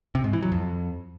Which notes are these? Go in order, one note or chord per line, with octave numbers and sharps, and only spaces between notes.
C3
G#2
E3
F#3
F2